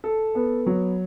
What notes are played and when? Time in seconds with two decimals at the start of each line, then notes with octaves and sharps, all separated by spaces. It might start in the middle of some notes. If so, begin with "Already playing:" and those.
0.04 A4
0.35 B3
0.66 F#3